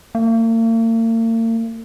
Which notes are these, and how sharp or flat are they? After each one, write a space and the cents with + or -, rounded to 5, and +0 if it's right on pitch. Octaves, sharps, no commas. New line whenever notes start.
A#3 -45